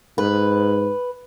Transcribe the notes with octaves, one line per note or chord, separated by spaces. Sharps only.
G#2 B4